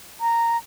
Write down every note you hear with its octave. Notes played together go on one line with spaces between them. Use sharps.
A#5